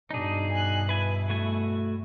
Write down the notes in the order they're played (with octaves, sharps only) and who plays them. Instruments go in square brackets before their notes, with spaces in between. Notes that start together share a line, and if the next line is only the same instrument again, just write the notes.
[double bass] G2 B2 [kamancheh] D4 [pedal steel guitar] D#4 G#4
[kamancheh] G#5 F#6
[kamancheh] E4 [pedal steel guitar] B4 G#5
[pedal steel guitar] A3 F#4 G#5